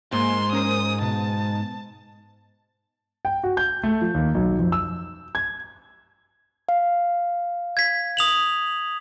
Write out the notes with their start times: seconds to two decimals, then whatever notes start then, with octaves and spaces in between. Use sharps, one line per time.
0.13 G#2 A#3 C6
0.53 C#4 A#4 C5 D#6
1.02 B2 A5
3.25 G5
3.43 F#4
3.57 G6
3.83 A3
4.01 F3
4.14 D#2
4.34 B1
4.59 F2
4.72 E6
5.35 G#6
6.69 F5
7.77 G#6 B6
8.17 D#6 F7 F#7